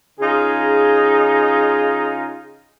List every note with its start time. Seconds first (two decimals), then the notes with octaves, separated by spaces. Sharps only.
0.20 C#3 D#4 F4 G#4